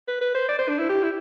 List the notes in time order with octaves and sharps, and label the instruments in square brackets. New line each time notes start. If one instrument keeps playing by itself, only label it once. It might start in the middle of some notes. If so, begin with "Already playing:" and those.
[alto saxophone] B4
B4
C5
D5
C5
D4
E4
G4
E4